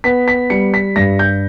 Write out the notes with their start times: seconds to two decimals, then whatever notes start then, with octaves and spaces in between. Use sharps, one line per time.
0.04 B3 B6
0.28 B6
0.50 G3 C#7
0.74 B6
0.96 G2 A#6
1.19 G6